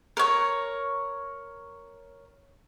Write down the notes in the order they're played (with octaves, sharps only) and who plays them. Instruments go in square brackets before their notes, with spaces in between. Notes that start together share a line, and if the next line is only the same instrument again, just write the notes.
[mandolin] A#4 C#5